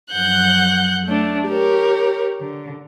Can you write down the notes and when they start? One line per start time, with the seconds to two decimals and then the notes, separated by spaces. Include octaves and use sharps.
0.13 F#2 F3 F#5 F#6 G6
1.05 A3 D4
1.48 G4 A#4 C#5
2.40 D3